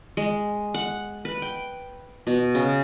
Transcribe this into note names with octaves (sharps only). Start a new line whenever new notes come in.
G#3
F#5
B4
G5
B2
C#3